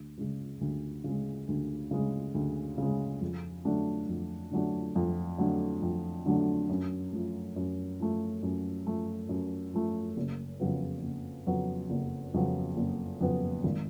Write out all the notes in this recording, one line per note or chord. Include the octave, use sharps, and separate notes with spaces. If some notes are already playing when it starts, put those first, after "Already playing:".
Already playing: D2
C#3 G#3
D2
C#3 G#3
D2
C#3 G#3
D2
C#3 G#3
F2
D3 F#3 A3 D4
F2
D3 F#3 A3 D4
F2
D3 F#3 A3 D4
F2
D3 F#3 A3 D4
F#2
F3 A3
F#2
F3 A3
F#2
F3 A3
F#2
F3 A3
F#1
F2 C#3 F#3 B3
F#1
F2 C#3 F#3 B3
F#1
F2 C#3 F#3 B3
F#1
F2 C#3 F#3 B3
G#1